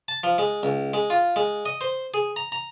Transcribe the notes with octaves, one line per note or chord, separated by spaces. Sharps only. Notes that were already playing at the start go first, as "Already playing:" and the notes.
A5
F3
G#3
C#2
G#3
F4
G#3
D#5
C5
G#4
A#5
A#5